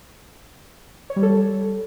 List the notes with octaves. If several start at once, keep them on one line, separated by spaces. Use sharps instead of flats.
C#5
G3
A4
G3